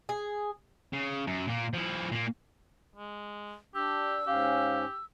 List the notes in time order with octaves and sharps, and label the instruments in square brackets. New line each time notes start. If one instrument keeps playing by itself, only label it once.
[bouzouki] G#4
[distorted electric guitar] C#3
F#2
A#2 A#3
F3 E4
A#2 A#3
[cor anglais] G#3
[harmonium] D4 [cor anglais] G4 [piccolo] E6
[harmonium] G#2 C#4 [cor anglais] G4 [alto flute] F5